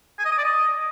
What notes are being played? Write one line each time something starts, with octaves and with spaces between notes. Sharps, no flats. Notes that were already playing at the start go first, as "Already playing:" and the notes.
G#5
D#5
D#6
D5
D#5